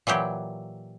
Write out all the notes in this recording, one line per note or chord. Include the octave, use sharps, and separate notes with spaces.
A#2 E3 F#3 G4